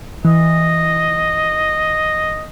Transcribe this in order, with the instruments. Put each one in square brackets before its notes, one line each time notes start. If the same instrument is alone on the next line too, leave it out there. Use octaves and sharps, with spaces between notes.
[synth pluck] E3 [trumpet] D#5